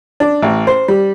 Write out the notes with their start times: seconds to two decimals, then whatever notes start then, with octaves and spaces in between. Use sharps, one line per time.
0.20 D4
0.42 A1
0.67 C5
0.88 G3